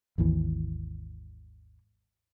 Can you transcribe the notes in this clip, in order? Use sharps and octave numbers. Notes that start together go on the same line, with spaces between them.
G#1 D#2 E3